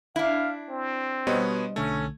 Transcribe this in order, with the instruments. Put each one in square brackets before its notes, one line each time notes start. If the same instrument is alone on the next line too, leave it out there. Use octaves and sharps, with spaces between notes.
[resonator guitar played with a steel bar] D4 E4 [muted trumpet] F5
[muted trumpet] C4
[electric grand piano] B2 B3 C#5 [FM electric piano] G3 C5 D#5
[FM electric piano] B1 D3 G#6 [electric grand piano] A3 [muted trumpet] C#4